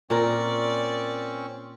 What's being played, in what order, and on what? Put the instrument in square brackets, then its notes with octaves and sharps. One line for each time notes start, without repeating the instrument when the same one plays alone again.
[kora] A#2 A#4 [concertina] C4 C#4 C#6 [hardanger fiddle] D5